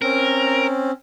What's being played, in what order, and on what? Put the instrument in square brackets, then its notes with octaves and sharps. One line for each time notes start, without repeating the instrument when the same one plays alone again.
[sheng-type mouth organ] C4 C#4 [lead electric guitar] A#4